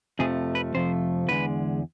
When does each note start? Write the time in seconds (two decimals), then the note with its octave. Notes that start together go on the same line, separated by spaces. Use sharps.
0.19 F2 C3 F3 A3 G#4
0.55 B4
0.75 F2 C3 F3 A3 C5
1.28 E2 D3 G#3 B4